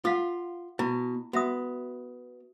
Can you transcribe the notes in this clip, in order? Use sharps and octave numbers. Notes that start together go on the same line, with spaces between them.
F4 A4 F5 F#5
B2 E4
B3 F#4 E5 D#6